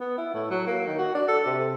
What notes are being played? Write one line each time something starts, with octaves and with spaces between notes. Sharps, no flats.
B3
E4
A2
F#3
A#3
D#3
F#4
D4
A4
C3